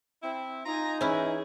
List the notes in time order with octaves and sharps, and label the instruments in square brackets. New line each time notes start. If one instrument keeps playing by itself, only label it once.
[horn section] C4 E4
[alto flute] D#4 [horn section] F4 D#5 A#5 [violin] G#5 A#6
[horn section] E3 [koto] C#4 E4 [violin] G#4